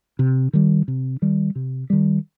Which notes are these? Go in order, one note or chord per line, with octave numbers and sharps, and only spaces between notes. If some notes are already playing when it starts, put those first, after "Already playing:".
C3
D#3 G3
C3
D#3 G3
C3
D#3 G3